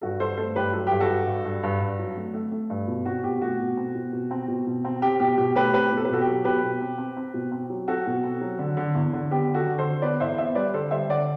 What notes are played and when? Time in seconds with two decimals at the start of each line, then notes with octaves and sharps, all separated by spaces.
0.01 G2 F#4 A4
0.20 G2 A4 C5
0.37 A3 A4 C5
0.56 G2 G4 B4
0.73 F#3 A4
0.87 G2 G4
1.00 F#4 A4
1.10 G2
1.27 G2
1.45 G2
1.63 G2
1.80 G2
1.99 F#3
2.17 A3
2.34 A3
2.51 A3
2.70 G2
2.88 B2
3.05 C4 F#4
3.23 B2 G4
3.41 A3 F#4
3.60 B2
3.77 C4
3.95 B2
4.13 B2
4.31 C4
4.48 B2
4.67 B2
4.85 C4
5.02 C4 G4
5.20 B2 G4
5.37 B2 G4
5.55 A3 G4 B4
5.73 C4 G4 B4
5.91 B2
5.97 A4
6.05 B4
6.09 B2 F#4 A4
6.21 G4
6.27 F#3
6.44 B2 G4 B4
6.63 B2
6.81 C4
6.98 C4
7.16 C4
7.34 B2
7.52 C4
7.69 F#3
7.88 C4 F#4 A4
8.06 B2
8.23 C4
8.41 F#3
8.59 D3
8.77 D3
8.95 E2
9.13 D3
9.31 B3 G4
9.48 D3
9.54 F#4 A4
9.66 D3
9.78 A4 C5
9.84 D3
10.02 B3 B4 D5
10.20 E2 C5 E5
10.38 B3 C5 E5
10.55 G3 B4 D5
10.73 D3 A4 C5
10.91 G3 C5 E5
11.09 D3 D5 F#5